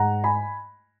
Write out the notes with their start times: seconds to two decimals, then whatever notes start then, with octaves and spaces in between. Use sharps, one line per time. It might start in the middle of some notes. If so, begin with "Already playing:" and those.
Already playing: G#2 F#5 A#5
0.24 G#5 B5